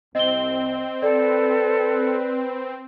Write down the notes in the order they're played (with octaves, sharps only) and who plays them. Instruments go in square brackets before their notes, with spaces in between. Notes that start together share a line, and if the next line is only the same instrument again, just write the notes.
[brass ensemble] C2 [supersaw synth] C4 [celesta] D#5 G7
[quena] A4 [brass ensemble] B4 [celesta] D5